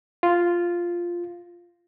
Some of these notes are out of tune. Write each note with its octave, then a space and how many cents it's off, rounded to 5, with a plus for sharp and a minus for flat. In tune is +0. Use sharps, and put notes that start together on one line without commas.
F4 -5